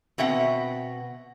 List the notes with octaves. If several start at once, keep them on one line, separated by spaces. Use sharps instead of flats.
B2 C4 E5 F#5